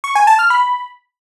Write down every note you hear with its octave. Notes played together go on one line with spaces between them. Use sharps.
C#6
G#5
A5
F6
B5